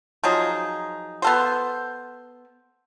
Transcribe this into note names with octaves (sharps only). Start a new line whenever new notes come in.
F3 F#3 D#4 G#4
B3 A4 C5